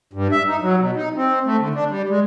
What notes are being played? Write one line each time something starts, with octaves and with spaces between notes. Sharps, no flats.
G2
E5
D#4
F#3
B2
D#4
C4
A3
D3
D4
G3
G#3